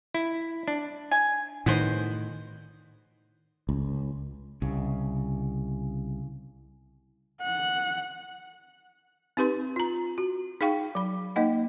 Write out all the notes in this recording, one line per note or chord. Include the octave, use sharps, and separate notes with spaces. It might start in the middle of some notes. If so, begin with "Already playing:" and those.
E4
D4
G#5
A2 D#3 B3 F#4 C5
C#2
C2 C#3
F#5
C4 D#4 G4 B4 C6
F4 A#5
F#4
D#4 G#4 F5 G5 C#6
F#3 B5
A#3 D#4 D#5 F#5